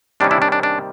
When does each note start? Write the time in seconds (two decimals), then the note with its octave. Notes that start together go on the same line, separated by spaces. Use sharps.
0.20 C3 D#3 G3 A#3 C#4 D4
0.31 D4 E4
0.42 D4
0.52 D4
0.63 D4